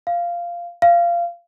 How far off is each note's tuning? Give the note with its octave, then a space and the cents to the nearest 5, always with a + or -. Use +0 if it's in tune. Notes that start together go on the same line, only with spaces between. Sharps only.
F5 -10
F5 -20